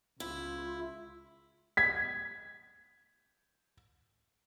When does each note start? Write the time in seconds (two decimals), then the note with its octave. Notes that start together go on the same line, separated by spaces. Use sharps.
0.20 C#2 E4 F4
1.77 G#6 B6